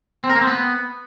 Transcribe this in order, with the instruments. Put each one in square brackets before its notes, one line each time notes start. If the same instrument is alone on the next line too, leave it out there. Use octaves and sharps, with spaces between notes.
[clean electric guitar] C4
A#4
A#3
C4
B3